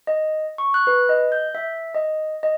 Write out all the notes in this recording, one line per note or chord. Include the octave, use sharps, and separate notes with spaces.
D#5
C#6
F#6
B4
D#5
G6
E5
D#5
D#5